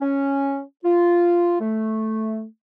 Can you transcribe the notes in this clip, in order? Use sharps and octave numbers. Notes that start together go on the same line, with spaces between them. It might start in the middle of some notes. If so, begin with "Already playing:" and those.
C#4
F4
A3